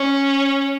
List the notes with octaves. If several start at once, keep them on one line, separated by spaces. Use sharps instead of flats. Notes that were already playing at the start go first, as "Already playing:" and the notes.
Already playing: C#4